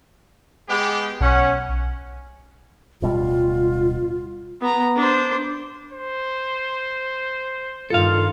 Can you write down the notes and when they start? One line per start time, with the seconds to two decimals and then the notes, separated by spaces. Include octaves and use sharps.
0.69 G#3 B3 G4
1.21 B1 C#4 F#5
3.02 D1 B2 G3 F4
4.61 B3 A#5
4.96 D4 C5
5.93 C5
7.90 G2 D#3 F4 A4 F5